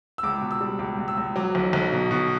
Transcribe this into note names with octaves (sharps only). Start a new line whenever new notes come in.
E6
C#2 D6
B2
E6
G3
C#2 D6
C#2
E6
C#2
F#3 D6
B1
B1
B2
B2